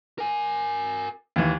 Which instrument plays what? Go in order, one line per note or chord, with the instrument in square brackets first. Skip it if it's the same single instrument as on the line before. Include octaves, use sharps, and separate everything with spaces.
[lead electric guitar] A#4 G#5
[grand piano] D#2 E3